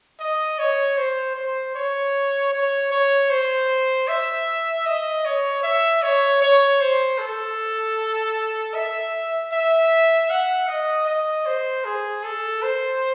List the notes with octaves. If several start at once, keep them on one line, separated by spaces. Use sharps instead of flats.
D#5
C#5
C5
C5
C#5
C#5
C#5
C5
E5
D#5
C#5
E5
C#5
C#5
C5
A4
E5
E5
F#5
D#5
D#5
C5
G#4
A4
C5